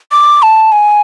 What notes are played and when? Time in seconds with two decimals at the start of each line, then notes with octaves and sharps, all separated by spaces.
0.12 D6
0.42 A5
0.72 G#5